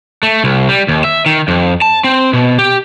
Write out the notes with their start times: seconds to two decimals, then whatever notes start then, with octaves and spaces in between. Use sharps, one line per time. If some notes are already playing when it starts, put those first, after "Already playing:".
0.23 A3
0.44 C2
0.69 G3
0.88 D#2
1.04 E5
1.26 D#3
1.48 F2
1.82 A5
2.04 C4
2.33 B2
2.58 G4